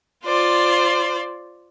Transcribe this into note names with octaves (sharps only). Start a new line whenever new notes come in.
F4 C5 D5